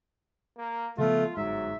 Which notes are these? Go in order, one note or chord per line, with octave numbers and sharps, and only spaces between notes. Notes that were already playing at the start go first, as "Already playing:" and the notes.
A#3
C#3 F3 A3 B3 F4
G1 G#2 F#3 E5